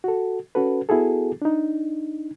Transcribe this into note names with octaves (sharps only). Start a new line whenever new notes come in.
F#4 A4
C#4 F#4 A4 B4
B3 E4 F#4 G#4 A4
D4 D#4